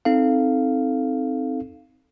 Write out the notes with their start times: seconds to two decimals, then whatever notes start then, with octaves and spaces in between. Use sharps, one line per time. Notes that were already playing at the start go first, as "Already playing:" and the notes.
0.05 C4 D#4 A4 F5